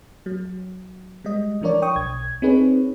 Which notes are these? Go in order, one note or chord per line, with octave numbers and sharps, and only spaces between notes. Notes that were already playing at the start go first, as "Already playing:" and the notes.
F#3
G3 G#3 D#5
E3 F3 D4 A#4 C#5 D5
G5 C#6 D#6
B1 G#6
C4 D#4 G#4 B4 C#5